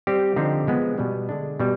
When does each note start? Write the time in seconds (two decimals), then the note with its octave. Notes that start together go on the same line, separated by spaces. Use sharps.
0.07 G3 C4 G4
0.36 D3 F3 C4 D#4 G4
0.67 F3 G#3 B3
0.98 B2 G3 B3
1.29 D3 G#3 D4
1.59 B2 G3